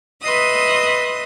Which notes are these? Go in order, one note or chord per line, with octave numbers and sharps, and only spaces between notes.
B4 D#5 E5 C6 D#6 F#6